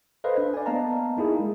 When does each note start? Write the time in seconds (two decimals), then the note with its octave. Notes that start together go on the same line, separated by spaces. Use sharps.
0.24 A4 B4 C5 D#5 F5
0.36 D4 B4
0.54 D5 G#5
0.66 A#3 B3 D#5 F5 A5 A#5
1.17 A#3 D#4 E4 G#4
1.35 G#3 A#3